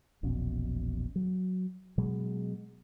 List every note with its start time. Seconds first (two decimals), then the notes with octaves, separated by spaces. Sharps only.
0.23 E1 A#1 B2 C#4
1.16 F#3
1.98 B2 F#3 G#3